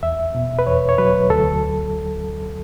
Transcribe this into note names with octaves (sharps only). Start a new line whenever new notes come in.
E2 E5
B2
B4
E2 C#5
C#5
F#3 B4
D2 A4